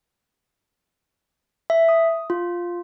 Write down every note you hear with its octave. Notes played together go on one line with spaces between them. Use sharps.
E5
D#6
F4